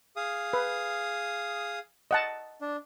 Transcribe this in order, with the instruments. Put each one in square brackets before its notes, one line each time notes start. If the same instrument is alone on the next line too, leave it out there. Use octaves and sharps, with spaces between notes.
[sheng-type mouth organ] G#4 F5 D#6
[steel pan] B4
D#5 F#5 A5
[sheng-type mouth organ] D4